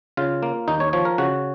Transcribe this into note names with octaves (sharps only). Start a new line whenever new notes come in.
C#3 F4
A#3
D#2 D#4
C#5
F3 C#5
A#4
C#3 F#4